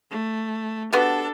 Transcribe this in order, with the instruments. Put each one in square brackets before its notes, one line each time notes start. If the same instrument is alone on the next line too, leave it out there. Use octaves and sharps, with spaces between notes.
[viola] A3
[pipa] B3 F#4 G4 [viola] D4 A4